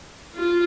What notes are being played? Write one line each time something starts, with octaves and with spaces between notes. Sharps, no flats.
F4